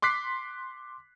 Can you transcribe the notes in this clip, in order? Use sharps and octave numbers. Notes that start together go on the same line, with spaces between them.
C6 D6 F#6 B6 C7